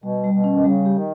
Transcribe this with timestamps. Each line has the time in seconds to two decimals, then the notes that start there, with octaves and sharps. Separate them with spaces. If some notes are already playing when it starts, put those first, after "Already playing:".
0.03 B2 G3
0.24 G3
0.34 B2
0.44 C#4
0.53 D#3
0.64 C#3 G3
0.86 G4
0.95 D#3